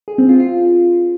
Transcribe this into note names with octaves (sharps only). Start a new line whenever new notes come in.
G#4
C4
F4
F4